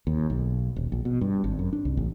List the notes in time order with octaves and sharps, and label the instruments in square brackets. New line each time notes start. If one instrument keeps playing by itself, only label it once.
[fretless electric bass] D#2
B1
D#1
A#1
B2
G2
G#1
F#2
D4
C2
A1